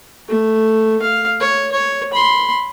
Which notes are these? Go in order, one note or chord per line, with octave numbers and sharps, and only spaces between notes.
A3
F5
C#5
C#5
B5 C6